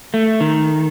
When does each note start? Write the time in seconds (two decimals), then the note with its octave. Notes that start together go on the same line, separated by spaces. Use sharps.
0.14 A3
0.41 D#3